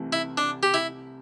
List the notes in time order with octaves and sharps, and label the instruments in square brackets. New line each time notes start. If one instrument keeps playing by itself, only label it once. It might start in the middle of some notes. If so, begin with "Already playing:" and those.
Already playing: [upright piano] C2 C3 E3 A3
[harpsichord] E4
D4
G4
E4